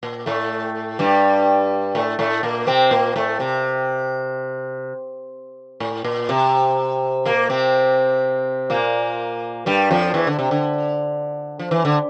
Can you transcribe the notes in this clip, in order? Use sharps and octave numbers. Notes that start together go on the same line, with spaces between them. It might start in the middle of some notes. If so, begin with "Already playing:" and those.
A#2
A2 A3
G2 G3
A2 A3
A2 A3
A#2 A#3
C3 C4
A#2 A#3
A2 A3
C3
A2
A#2
C3
A#2 A#3
C3 C4
A#2 A#3
G2 G3
F2 F3
E2 E3
D3
C3
D3
F3
E3
D3